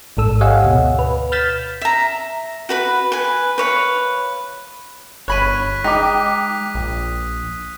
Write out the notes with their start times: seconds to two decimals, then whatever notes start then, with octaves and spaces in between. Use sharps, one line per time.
0.17 A1 G#2 A4 E6
0.41 G4 C#5 D#5 F5 F#5 G#5
0.63 D2 B2
0.99 B4
1.32 F6 G6 A6 B6 E7
1.81 E5 A#5
2.69 F#4 B4 B5
3.12 B4 G#5
3.58 B4 C#5 F5
5.28 G1 C#5 B5 F#6 B6 D#7
5.84 G#3 D#4 G5 D6 D#6 B6
6.74 A#1